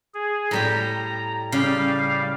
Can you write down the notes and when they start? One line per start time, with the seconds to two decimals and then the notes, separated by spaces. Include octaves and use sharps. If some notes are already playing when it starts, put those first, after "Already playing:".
0.14 G#4
0.51 A2 G3 G4 A#5
1.52 C#3 G3 F5